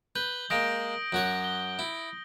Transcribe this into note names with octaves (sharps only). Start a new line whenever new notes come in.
B4 G6 F#7 G7
G#3 A#3 D#6 A#6 D7
F#2 F#4 C#5
G7
E4